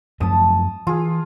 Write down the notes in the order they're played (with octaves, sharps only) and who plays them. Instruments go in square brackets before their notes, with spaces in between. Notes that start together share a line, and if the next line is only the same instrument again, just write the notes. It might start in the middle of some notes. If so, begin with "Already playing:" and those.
[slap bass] F#2 F3 A3 [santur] A5 D#6
[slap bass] E3 [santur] F4 G#4